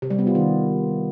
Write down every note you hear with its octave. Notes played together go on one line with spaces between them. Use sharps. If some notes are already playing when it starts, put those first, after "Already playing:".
C3
G3
B3
F4
D#3